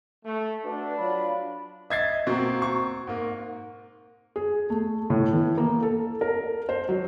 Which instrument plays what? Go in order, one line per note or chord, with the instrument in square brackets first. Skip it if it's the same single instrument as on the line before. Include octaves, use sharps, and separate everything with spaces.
[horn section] A3
[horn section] D4 [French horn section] F#4 B4
[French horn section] F#3 F4 [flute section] B5
[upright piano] D#5 G#6 C7 [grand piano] E5 A6
[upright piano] B2 A#3 [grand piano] C4
[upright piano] C#6
[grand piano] G#2 A#3
[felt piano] G#4
A3
A2
E3
A#3
A4
A#4
C5
F#3